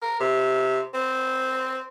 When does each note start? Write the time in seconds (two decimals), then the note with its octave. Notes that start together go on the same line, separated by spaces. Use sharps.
0.02 A#4
0.20 C3
0.94 C4